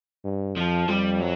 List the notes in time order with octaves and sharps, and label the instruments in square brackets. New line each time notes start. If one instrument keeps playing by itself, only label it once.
[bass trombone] G2
[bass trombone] F2 [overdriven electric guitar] F3
[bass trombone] F2 [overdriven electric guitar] G3
[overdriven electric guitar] F#3